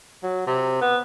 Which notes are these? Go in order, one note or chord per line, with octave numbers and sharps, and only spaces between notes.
F#3
C3
B3